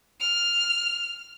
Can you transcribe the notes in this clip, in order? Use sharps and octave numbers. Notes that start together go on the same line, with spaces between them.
F6